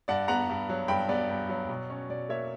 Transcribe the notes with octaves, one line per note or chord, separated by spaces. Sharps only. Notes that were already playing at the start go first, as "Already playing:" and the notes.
G2 D5 F#5
B3 F#5 A#5
G2
F#3
G2 G5 B5
B3 D5
G2
F#3
B2
C#4
B2 D5
A#3 C#5 E5